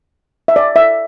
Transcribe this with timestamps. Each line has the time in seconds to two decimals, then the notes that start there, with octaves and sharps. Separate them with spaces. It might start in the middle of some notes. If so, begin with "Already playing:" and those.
0.48 E5
0.56 D5
0.76 E5